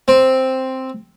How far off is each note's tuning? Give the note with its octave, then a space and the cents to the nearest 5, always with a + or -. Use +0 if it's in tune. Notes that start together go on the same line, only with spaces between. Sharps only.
C4 +0